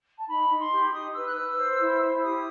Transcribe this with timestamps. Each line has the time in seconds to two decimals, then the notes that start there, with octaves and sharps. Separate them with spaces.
0.18 A5
0.28 D#4 B5
0.50 D#4
0.60 C6
0.72 G4
0.93 D#4 D#6
1.15 B4 E6
1.26 F#6
1.36 B4 E6
1.58 C5
1.80 E4
2.01 E4
2.22 G4 D#6